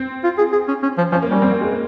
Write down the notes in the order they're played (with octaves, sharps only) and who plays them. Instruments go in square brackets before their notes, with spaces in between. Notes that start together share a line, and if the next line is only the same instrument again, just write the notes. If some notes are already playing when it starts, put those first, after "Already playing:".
Already playing: [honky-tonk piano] C4
[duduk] F4
G#4
G#4
C#4
C#4
F3
[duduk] F3 [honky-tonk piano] C#4
[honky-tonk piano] A#3
[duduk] G3 [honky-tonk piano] C#4
[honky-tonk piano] C4
A#3
G#3
A#3